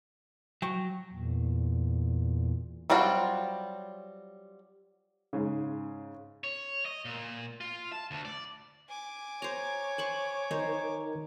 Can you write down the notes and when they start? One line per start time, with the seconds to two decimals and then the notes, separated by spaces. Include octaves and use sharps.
0.62 F#3 G5 C#6
1.12 E2 A#2
2.90 F#3 G3 C4 F4 F#4
5.33 G#2 C#3
6.44 C#5
6.85 D#5
7.05 A#2
7.61 F4
7.92 A5
8.11 D2
8.25 D5
8.88 G#5 D6
9.42 C5 C#5 A#5
9.98 C5 B5 C#6
10.51 D#3 D#4 C5